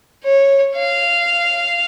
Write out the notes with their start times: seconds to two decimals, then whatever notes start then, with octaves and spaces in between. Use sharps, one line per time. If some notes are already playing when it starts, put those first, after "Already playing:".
0.24 C#5
0.76 F5